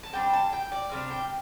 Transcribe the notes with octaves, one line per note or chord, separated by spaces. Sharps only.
A5
C3 G3 D4 G5
A5
G5
D5
C3 G3 D4 F5
G5